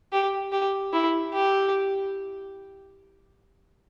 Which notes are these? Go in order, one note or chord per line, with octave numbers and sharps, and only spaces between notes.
G4
G4
E4
G4